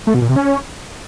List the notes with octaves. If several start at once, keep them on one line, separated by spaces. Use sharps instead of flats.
A3
B2
A#2
C3
C#4